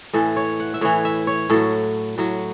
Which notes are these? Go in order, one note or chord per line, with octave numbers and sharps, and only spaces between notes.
A2 E3 A4
C#5
F#5
E5
A2 E3 C#5
E5
C#5
A2 F#3 A4
A2 F#3